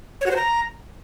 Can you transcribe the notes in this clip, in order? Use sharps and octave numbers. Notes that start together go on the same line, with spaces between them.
C#5
F#4
C5
A#5